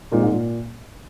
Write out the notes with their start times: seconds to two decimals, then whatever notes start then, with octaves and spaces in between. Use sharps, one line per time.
0.12 A#2 G#3 C4 D#4 A#4
0.22 G#2
0.32 A#2